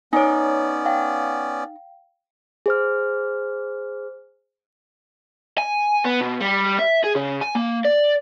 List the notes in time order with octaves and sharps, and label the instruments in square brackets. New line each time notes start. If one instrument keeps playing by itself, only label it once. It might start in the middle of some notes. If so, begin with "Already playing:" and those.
[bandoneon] B3 C#4 D5 [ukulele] D#4 [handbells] C#5 G#5
[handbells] F5 G5
[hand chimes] G#4 C5 F6
[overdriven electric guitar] G#5
B3
B2
G3
E5
G#4
C#3
G#5
A#3
D5